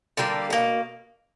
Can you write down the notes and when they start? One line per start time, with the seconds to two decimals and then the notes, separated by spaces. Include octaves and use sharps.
0.17 D3 G3 A#3 D4
0.50 B2 A#3